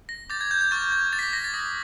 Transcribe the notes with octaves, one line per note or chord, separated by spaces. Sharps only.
A#6
D6 G6 A6
G#6
G6
G6
C#6 F6 A6
G#6
D6 A6
G6 A#6 B6
A#6
A6
D#6 A#6
F#6